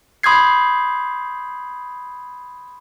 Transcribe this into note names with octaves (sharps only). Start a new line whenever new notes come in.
B5 C6 D#6 G6 G#6 C7